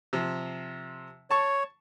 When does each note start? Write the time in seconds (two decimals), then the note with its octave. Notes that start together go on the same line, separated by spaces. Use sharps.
0.13 C3 F3
1.31 C#5 A5 C#6